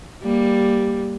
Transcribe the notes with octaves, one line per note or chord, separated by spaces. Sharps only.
G3 A#3